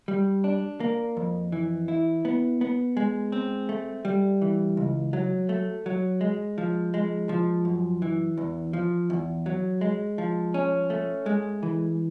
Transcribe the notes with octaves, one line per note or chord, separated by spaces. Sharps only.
G3
D4
A#3
F2
E3
E4
B3
B3
G#3
C4
A3
G3
E3
C#2
F#3
A3
F#3
G#3
F3
G#3
F3
F#2
E3
E2
F3
E2
F#3
G#3
F3
C#4
A3
G#3
E3